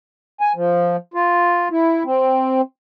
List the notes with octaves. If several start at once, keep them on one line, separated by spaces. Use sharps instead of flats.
G#5
F3
F4
E4
C4